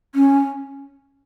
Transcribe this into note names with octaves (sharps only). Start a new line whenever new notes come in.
C#4